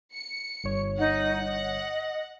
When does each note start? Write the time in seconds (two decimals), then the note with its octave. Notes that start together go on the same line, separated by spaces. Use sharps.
0.13 C#7
0.64 G1 C#5
0.99 D#4 F#5
1.46 D#5